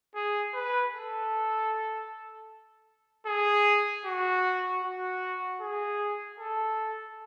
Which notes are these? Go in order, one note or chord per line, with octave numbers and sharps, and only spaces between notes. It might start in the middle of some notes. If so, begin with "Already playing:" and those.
G#4
B4
A4
G#4
F#4
F#4
G#4
A4